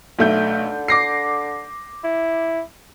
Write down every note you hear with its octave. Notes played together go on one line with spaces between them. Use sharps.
B1 D3 A3 G6
D6 A#6 C7
E4